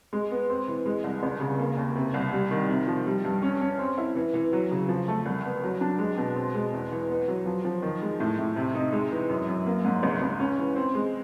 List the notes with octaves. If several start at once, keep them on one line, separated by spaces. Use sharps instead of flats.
G#3
B3
C4
E3
G#3
C2
C#2
C#3
A#3
D#2
C3
C2
G3
D#3
C3
F3
G3
G2
C#4
C#4
C4
E4
E3
E3
F#3
C#3
F3
A3
C2
B3
F#3
D4
G#3
B2
C4
G#3
E2
E3
B3
F#3
F3
F3
D#3
G#3
A2
A2
C3
D#4
G#3
E3
F#2
F#2
A#3
G#2
C#2
C#2
C#4
E3
C4
G#3